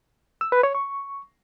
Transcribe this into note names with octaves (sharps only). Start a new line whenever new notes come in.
E6
B4
C#5
C#6